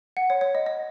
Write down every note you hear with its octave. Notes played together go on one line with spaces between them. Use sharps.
F#5
C#5
C#5
D#5
D#5